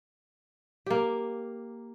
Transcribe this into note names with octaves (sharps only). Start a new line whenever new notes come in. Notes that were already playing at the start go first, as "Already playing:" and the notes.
A#3 G4